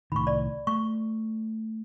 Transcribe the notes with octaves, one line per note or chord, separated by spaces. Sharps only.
C2 A2 D#3 B5 C#6
D5
A3 C#6